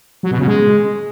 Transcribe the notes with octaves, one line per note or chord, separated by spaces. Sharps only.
F#3
B2
C#3
G#3